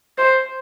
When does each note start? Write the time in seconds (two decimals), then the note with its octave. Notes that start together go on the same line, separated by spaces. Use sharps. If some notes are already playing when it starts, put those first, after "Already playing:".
0.18 C5